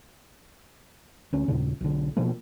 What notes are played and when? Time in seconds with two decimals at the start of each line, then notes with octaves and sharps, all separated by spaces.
1.33 D2 C#4
1.48 D#2 A#2 C#3
1.81 B1 D3
2.17 B2 F3 A#3